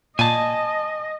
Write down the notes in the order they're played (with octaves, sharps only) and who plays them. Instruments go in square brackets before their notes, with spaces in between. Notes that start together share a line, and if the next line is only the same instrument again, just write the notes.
[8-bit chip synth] A#2 [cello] D#5 [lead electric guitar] G#5 A5